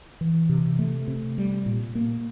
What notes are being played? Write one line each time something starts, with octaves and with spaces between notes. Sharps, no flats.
E3
C3
A3
C3
G3
A#2
A#3